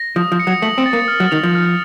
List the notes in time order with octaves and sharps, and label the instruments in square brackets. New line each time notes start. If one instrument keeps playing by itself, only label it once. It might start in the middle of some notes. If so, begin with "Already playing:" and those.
Already playing: [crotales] A#6
[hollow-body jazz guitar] F3 [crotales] D#6
[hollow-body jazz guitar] F3
[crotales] C#7
[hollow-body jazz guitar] F#3
[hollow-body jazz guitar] A3 [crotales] F#7
[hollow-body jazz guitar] C4
[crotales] A6
[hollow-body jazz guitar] A#3
[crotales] F6
[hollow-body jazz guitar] F#3
[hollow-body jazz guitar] D#3 [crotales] F7
[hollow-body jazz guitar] F3
[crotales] F6